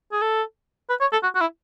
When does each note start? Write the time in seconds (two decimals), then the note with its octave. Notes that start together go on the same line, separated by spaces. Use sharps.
0.12 G#4
0.21 A4
0.89 B4
1.01 C#5
1.12 A4
1.23 F#4
1.35 F#4
1.41 E4